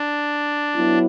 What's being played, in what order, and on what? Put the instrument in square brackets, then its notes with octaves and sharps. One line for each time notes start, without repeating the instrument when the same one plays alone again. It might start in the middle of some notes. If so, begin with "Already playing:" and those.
Already playing: [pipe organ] D4
[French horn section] F#3 B3 E4